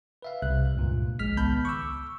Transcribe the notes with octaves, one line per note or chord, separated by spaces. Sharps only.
B4 E5 F5
C2 C3 F#6
C#2 G2 A#2
A#1 G#3 F6 B6
C#2 D#3 B3 A5 B5 G6
C#6 D6 E6